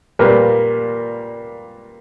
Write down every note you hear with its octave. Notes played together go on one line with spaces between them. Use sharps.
A#2 G3 A#3 B4